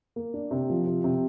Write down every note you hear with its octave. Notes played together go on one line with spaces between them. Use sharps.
A#3
D4
C3
F3
C3
C3